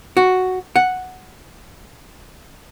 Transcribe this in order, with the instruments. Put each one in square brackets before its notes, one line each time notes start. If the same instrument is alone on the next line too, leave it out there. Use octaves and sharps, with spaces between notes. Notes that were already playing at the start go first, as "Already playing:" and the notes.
[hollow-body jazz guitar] F#4
F#5